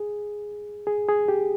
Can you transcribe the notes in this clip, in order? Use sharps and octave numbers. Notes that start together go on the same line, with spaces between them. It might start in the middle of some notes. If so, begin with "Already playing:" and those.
Already playing: G#4
G#4
G#4
G4